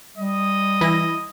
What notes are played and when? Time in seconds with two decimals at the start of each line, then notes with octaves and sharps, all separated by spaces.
0.18 G3 D#5
0.81 E3 E4 A#6